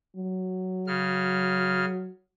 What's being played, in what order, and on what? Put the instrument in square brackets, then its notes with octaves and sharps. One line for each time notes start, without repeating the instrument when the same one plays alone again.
[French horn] F#3
[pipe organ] C#3 F6